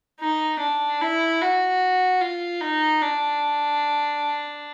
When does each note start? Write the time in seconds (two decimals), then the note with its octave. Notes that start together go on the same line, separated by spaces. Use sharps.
0.20 D#4
0.60 D4
1.01 E4
1.41 F#4
2.21 F4
2.61 D#4
3.01 D4